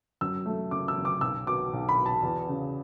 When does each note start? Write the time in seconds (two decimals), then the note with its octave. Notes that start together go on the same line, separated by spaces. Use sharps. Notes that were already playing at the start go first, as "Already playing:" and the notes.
0.21 F#2 E6
0.46 A3
0.71 F#1 D6
0.88 E6
0.97 F#1
1.05 D6
1.21 B1 E6
1.46 B2 D6
1.73 B1
1.89 B5
1.97 B2
2.06 A5
2.23 E2
2.48 C#3